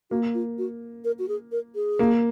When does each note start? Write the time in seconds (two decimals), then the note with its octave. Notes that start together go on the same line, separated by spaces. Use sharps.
0.11 A#3 F#4
0.34 F4
0.58 F#4
1.04 A#4
1.19 F#4
1.28 G#4
1.52 A#4
1.75 G#4
1.99 A#3